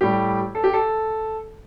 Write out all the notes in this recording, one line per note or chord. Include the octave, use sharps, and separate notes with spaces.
A2 G3 G4
A4
G4
A4